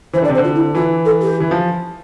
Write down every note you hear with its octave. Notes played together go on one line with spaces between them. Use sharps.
E3 C5
D3 D5
C3
C5
D3
F4
E4
E3 F4
A4
G4
E3
F3